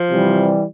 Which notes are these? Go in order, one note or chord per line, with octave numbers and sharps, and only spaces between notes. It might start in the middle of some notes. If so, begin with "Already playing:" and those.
Already playing: F3
C3 E3 G3